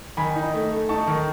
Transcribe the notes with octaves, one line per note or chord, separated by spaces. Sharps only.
D#3 G#5 B5
D#4
A3
A3
D#4 A5 C#6
D#3